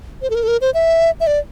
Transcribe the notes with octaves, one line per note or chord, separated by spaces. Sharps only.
C5
A4
A#4
A4
A#4
C5
E5
E5
D5